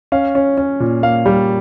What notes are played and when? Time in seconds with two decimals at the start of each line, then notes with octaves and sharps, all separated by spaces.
0.12 C#4 F5
0.35 C#4
0.58 C#4
0.80 A#2
1.03 A#3 F5
1.26 G3